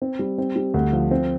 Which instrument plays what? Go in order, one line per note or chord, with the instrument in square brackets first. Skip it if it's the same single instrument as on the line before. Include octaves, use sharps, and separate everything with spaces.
[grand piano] C4
G3
C4
G3
D2
F3
C4